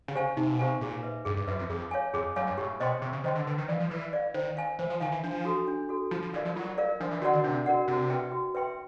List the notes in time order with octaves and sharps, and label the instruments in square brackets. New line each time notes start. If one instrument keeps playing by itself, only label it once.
[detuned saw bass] C#3
[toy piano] G4 C5 F5 G#5
[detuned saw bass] C3 [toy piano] D#4
[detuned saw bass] B2
[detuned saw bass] C3 [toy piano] G4 C5 F5 G#5
[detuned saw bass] A#2 [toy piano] G#4
[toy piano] B4 E5
[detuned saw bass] G2 [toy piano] G#4
[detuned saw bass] G2
[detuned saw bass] F#2 [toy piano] B4 E5
[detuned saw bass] F2
[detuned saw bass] F2 [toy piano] G#4
[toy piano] C#5 F5 G#5
[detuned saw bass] F2 [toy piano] G#4
[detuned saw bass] F#2 [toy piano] C#5 F5 G#5
[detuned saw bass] G2
[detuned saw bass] A2 [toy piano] G4
[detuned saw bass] B2 [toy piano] C5 D#5 G5 C6
[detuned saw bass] C3 [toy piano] G4
[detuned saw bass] C#3
[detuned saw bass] D#3 [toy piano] C5 D#5 G5 C6
[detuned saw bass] D3
[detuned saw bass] D3 [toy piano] B4
[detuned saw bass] D#3
[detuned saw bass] E3 [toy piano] D5
[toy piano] F5
[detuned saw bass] F3
[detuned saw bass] E3 [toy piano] B4
[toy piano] D5 F5
[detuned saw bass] D#3 [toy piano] C5
[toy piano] F5 G#5
[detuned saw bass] E3 [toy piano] C5
[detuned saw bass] F3
[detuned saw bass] D#3 [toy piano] F5 G#5
[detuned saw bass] E3
[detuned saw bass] F3 [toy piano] D4
[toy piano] F#4 A4
D4
F#4 A4
[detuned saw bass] F3 [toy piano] F4
[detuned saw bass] F3
[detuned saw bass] E3 [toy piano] A#4 D5 F5
[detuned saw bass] F3
[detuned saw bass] F#3 [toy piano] F4
[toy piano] A#4 D5 F5
[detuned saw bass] F3 [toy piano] D4
[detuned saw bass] E3
[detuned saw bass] D#3 [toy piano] F#4 A#4 D5 F#5
[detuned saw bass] D3
[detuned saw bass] C3 [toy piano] D4
[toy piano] F#4 A#4 D5 F#5
[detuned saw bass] C3 [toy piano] F#4
[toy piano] B4 E5 G5 C6
F#4
B4 E5 G5 C6